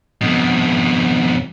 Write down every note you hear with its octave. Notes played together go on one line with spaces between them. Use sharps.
F2 B2